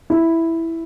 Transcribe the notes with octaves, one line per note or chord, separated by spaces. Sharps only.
E4